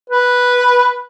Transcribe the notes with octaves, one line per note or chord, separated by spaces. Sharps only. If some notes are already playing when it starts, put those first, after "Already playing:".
B4